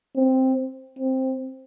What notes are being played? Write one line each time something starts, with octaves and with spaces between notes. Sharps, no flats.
C4
C4